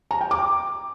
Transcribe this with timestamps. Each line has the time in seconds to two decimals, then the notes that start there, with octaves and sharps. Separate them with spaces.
0.11 A#5
0.21 G5
0.31 D6